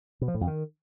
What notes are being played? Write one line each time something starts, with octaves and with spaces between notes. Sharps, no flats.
B2
F3
A2
F2
D#3